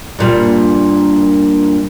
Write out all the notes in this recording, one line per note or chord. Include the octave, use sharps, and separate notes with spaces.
G2 A#2 G3